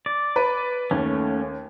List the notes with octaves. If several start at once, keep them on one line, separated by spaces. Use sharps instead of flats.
D5
B4 B5
D#2 A3 C#4